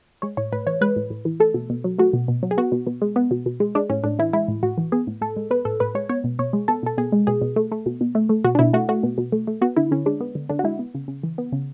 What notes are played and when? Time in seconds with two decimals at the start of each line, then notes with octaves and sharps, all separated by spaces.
0.22 G#3 C#5
0.37 A2 C#5
0.52 A2 B4
0.66 E3 C#5
0.81 G#3 B4
0.96 A2
1.10 A2
1.25 E3
1.40 A3 A4
1.54 B2
1.70 B2
1.84 F#3
1.99 A3 F#4
2.13 B2
2.28 B2
2.43 F#3
2.51 G#4
2.58 B3 F#4
2.72 B2
2.87 B2
3.02 G#3
3.16 B3
3.31 B2
3.46 B2
3.60 G#3
3.75 G#3 D4
3.90 A2 C#4
4.04 A2 D4
4.19 E3 E4
4.33 G#3 E4
4.48 A2
4.63 A2 F#4
4.78 E3
4.92 B3 G#4
5.07 A2
5.21 A2 A4
5.36 G#3
5.51 B3 B4
5.65 A2 A4
5.80 A2 B4
5.95 G#3 C#5
6.09 B3 C#5
6.24 B2
6.39 B2 C#5
6.53 G#3
6.68 B3 A4
6.83 B2 A4
6.98 B2 G#4
7.12 G#3
7.27 B2 G#4
7.41 B2
7.56 A3
7.72 A3
7.86 B2
8.01 B2
8.15 A3
8.29 A3
8.44 B2 F#4
8.55 D4
8.59 B2 E4
8.73 A3 F#4
8.89 A3 F#4
9.03 B2
9.18 B2
9.32 A3
9.47 A3
9.61 B3 F#4
9.77 D3 E4
9.91 D3 C#4
10.06 G#3 D4
10.21 B3
10.35 D3
10.49 D3 D4
10.59 F#4
10.64 G#3 E4
10.79 B3
10.95 C#3
11.08 C#3
11.23 E3
11.38 B3
11.52 C#3